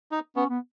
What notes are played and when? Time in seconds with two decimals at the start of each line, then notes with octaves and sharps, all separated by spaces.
0.12 D#4
0.36 B3 C#4
0.50 B3